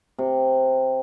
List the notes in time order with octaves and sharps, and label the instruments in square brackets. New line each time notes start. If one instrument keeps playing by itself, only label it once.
[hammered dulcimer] C3